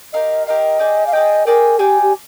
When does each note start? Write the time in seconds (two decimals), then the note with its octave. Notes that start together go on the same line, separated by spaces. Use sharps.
0.13 G4 A#4 D#5 F5
0.47 G4 A#4 D#5 F5
0.79 G#4 D5 G5
1.07 F5
1.13 G#4 D5 D#5 G5
1.47 G#4 A#4 D5 G5
1.79 G4 G#4 D5 G5
2.02 G4